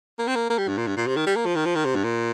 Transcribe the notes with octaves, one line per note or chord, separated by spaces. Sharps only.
A#3
C4
A#3
A#3
G3
G2
A#2
G2
A#2
C3
D#3
G3
A#3
F3
D#3
F3
D#3
C3
G2
A#2